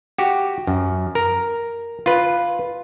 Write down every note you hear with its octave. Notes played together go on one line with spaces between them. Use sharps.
F#4 G4
F#2
A#4
F4 B4